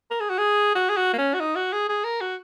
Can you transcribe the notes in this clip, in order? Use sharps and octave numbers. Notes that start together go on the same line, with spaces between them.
A#4
G#4
F#4
G#4
F#4
G#4
F#4
A#3
C#4
F#4
D#4
F#4
G#4
G#4
A#4
F#4